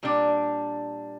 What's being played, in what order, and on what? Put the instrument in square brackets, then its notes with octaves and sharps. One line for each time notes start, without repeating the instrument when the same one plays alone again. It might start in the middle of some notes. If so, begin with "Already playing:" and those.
[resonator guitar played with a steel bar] A#2 G3 D4